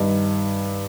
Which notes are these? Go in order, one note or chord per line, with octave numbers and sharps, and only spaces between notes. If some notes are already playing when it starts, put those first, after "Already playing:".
Already playing: G2 D#3